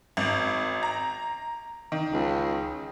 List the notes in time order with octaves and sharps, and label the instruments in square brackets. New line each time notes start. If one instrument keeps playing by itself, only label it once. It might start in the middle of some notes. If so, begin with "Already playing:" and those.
[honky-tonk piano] G#1
A#5
D#3
[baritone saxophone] C#2